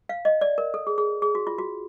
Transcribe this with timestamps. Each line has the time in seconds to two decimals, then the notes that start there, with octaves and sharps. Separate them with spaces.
0.09 F5
0.25 D#5
0.41 D5
0.58 A#4
0.74 A4
0.87 G#4
0.98 G#4
1.22 G#4
1.35 F#4
1.47 F4
1.59 F#4